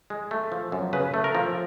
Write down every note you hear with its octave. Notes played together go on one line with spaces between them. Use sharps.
G#3
A3
F3
F#2
C#3 B4
A3
A#4
F3